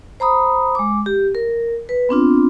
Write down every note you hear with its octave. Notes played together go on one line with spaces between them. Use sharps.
C5 A#5 B5 D#6
G#3 D6
G4
A#4
B4
B3 C4 D4 F4